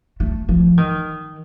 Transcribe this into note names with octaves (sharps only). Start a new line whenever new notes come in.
A3
F3
D#3